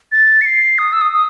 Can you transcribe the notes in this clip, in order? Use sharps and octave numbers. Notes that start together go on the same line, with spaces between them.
A6
C#7
C7
D#6
E6
D#6
D#6